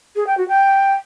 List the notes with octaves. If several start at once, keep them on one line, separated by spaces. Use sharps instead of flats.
G#4
G5
F#4
G5